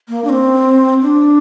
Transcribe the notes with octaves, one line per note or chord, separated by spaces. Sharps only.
A#3
D4
C4
D4